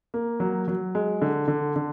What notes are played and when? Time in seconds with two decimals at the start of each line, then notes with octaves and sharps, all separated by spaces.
0.14 A#3
0.40 F#3
0.68 F#3
0.95 G#3
1.22 D3
1.48 D3
1.76 D3